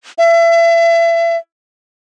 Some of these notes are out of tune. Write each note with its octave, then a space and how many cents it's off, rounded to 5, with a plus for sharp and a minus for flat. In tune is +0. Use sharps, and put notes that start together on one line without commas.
E5 +35